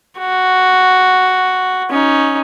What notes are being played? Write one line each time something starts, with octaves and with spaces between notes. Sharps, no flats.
F#4
C#4 D#4